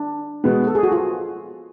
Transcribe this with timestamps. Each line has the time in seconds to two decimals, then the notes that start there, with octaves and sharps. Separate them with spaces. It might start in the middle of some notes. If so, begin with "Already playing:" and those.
Already playing: D4
0.44 B2 G#3 B3
0.67 A4
0.75 G#4
0.83 F#4
0.92 F4